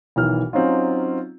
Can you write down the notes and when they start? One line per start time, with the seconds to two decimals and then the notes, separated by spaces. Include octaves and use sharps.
0.16 B1 D#3 E3 F6
0.53 F#3 C4 C#4 D#4 F4